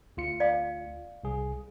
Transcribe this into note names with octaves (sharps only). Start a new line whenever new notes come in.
D2 F4 C#7
D5 F5
C2 G#4